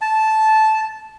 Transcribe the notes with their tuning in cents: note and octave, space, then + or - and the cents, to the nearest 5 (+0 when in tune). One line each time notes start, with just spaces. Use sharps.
A5 -10